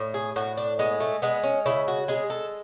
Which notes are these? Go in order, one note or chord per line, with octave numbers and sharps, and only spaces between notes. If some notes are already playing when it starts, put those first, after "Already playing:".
Already playing: A2
G#4
A2 F#4
D4
G#3 B3
A3
G#3 B3
C#4
C#3 E4
F#4
G#3 G#4
A4